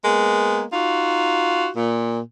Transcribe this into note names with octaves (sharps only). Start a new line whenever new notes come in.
G#3 A#3 B3
D#4 F4 F#4
A#2